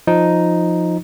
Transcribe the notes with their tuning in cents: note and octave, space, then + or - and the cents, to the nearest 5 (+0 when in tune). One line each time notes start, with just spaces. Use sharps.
F3 +0 D#4 +0